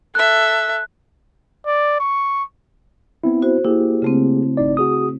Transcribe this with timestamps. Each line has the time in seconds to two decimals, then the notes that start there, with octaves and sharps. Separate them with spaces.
0.15 A4 E5 F#6
1.66 D5
2.00 C#6
3.24 B3 C4 E4
3.42 F#4 C5
3.65 A#3 E4 G4 G#4
4.02 C#3 A3 C4
4.57 G#1 D#4 D5
4.77 F#4 G#4 D#6